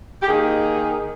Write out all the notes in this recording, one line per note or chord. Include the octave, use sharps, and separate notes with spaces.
G4
D#3 A#3 D#4 G#4